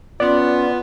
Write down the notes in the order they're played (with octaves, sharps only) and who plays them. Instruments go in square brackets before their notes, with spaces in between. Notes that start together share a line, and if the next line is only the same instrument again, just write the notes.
[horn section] B3 [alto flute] C#4 [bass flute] F4 [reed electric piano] D5